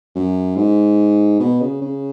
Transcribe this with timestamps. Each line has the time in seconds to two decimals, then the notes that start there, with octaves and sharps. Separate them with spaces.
0.16 F#2
0.56 G#2
1.40 B2
1.61 C#3
1.82 C#3